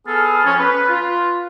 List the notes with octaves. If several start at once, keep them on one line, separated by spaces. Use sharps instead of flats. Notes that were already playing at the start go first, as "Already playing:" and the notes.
B3 G#4 A4 F6
F3 C4 C#4
B4
F4